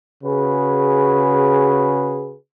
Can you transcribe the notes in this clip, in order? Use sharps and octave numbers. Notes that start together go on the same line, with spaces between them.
C#3 F#4 G#4 B4